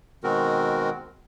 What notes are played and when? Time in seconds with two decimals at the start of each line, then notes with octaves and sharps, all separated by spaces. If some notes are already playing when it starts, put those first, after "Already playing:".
0.24 B2 D#3 G#3 C4 F#4 A#4